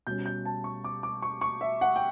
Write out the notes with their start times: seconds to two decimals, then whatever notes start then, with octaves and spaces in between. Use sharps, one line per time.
0.07 B2 G3 C#4 G6
0.26 G6
0.45 A5
0.64 C#6
0.84 D6
1.03 D6
1.22 C#6
1.41 C#6
1.61 E5
1.81 F#5
1.96 G5